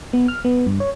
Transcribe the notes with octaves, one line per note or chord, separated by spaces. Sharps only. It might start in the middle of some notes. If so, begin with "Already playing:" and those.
B3
F6
B3
G2
C#5